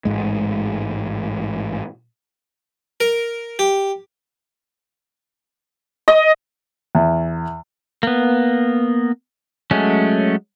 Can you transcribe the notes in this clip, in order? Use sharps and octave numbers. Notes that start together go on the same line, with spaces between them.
A1 G#2 G#3
A#4
G4
D#5
E2
A#3 B3
F#3 G#3 A3 C#4